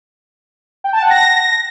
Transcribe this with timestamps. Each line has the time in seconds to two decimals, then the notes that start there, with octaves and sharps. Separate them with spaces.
0.84 G5
0.93 A5
1.02 F#5
1.11 A#6